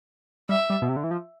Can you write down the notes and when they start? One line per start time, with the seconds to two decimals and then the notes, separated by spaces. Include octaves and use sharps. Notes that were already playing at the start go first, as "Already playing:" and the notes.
0.49 G3 E5
0.70 G3
0.82 B2
0.89 C3
0.96 D3
1.04 E3
1.11 F3